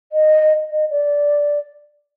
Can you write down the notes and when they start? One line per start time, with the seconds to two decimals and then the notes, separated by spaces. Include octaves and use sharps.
0.12 D#5
0.72 D#5
0.90 D5